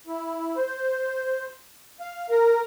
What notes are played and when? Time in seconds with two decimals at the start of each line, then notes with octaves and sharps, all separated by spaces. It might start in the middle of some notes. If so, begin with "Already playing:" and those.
0.07 E4
0.56 C5
2.00 F5
2.29 A#4